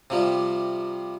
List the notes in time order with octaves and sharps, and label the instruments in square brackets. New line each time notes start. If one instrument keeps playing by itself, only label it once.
[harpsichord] C3 F3 G3